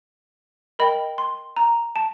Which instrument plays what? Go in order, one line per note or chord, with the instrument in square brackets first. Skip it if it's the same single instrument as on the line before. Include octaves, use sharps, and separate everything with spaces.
[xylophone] A#4 D#5 G5 B5
C6
A#5
A5